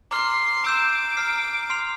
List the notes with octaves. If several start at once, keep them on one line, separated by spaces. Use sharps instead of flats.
A#5 C6 D6 F6
A#5 D6 E6 G6 C7 E7
A#5 F6 C7
C6 F6 C7 F7